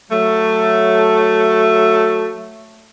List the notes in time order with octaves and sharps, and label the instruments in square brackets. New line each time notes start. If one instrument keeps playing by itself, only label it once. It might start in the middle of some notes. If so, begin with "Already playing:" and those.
[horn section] F#3 A3